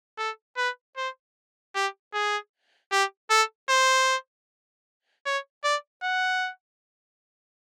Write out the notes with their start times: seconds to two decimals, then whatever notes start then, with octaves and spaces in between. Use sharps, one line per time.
0.18 A4
0.57 B4
0.97 C5
1.75 G4
2.13 G#4
2.92 G4
3.30 A4
3.69 C5
5.26 C#5
5.64 D5
6.03 F#5